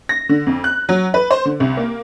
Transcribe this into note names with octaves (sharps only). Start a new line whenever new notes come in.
A#6
D3
F2
F#6
F#3
B4
C5
D3
C2
A#3